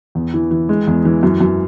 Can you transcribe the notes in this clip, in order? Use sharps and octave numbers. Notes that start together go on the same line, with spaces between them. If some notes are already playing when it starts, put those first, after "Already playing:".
E2
E3
E3
G#3
E2
E3
F#2
F#2